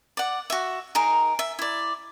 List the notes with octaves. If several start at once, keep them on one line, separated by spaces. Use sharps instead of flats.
D5 F#5
F#4 E5
D#4 G#4 A#4
E5
E4 D5